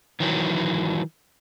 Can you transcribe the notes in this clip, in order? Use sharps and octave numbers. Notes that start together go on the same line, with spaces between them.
D#3 E3 F#3